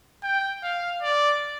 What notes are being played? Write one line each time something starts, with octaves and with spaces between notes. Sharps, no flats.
G5
F5
D5